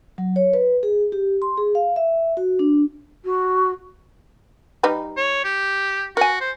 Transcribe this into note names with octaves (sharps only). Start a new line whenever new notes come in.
F#3
C#5
B4
G#4
G4
C6
G#4
F5
E5
F#4
D4
F#4
G3 D#4 B4
C#5
G4
F#4 A#4 G#5
C5